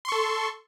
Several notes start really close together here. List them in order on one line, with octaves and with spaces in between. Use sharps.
C6 C#6 A4